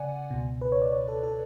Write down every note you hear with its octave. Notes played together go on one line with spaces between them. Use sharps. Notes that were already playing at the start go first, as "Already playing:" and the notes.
Already playing: C#3 D5 F#5 G#5
C#2 B2
B4
C#5
D5
C#5
A4
A4